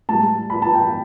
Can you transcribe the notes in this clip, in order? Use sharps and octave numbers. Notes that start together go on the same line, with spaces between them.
A2 G3 A5
B5
A5
G5